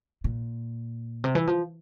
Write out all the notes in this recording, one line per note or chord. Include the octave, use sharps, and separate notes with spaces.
A#2
C3
E3
F3